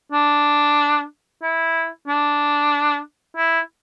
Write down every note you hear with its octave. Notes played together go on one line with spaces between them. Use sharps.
D4
E4
D4
E4